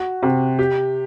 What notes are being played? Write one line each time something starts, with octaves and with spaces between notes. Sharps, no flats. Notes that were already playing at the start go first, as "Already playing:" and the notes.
Already playing: F#4
C3
G4